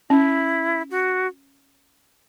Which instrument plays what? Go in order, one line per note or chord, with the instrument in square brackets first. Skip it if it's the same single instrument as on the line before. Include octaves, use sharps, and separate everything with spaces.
[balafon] C#4 [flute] E4
[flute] F#4